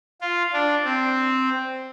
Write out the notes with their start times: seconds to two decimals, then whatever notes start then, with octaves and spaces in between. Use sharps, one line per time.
0.21 F4
0.53 D4
0.84 C4